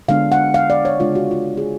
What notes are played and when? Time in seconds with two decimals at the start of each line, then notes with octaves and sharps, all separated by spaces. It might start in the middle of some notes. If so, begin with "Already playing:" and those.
0.09 D3 G#3 B3 D4 F5
0.32 F#5
0.54 F5
0.70 D5
0.85 C#5
1.00 C#3 G#3 D4 F4
1.15 F#4
1.31 F4
1.57 G#4